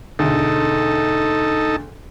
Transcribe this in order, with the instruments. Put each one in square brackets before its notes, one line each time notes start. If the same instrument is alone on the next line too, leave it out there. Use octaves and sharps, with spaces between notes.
[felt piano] E1 D2 [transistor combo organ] D#4 A4